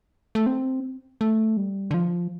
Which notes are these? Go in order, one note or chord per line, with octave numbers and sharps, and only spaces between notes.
A3
C4
A3
G3
D3
F3